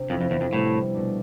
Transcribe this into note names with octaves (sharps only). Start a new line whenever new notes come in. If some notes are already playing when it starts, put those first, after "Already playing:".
Already playing: C3 D4
F2 F3 C4 E4
F2
E2
F2
A2 C3 G3 B3 E4
B2 A3 D4